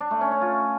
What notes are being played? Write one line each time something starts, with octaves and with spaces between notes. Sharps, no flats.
D4
A3
C#4
C#5
F4